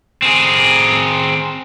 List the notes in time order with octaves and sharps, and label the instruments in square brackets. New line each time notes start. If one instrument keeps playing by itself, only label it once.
[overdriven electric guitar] C4 G#4